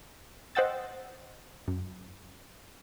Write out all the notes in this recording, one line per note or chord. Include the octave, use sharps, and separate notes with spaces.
C5 D#5 F#5 G5 E6 A6
F#2